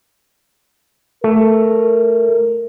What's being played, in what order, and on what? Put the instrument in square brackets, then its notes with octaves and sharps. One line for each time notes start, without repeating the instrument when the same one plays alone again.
[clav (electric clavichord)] A3 [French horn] A#4